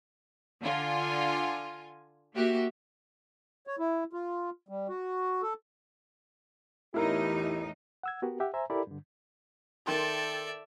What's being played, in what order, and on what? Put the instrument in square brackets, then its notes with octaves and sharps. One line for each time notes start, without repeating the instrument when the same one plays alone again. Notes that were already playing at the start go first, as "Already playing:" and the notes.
[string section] D3 F4 G#5
A#3 F#4 G4 E5
[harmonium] C#5
E4
F4
G3
F#4
A4
[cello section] E2 A2 D#4 [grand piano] E4 A#4 [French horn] G4
[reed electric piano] F#5 E6 G#6
B3 F#4 G4 A#4
G4 E5 F#5
C5 E5 G#5 A#5
E4 G4 A4 A#4 D5 B5
G2 D3
[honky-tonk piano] D#3 G5 C6 [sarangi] A4 [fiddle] D5 E5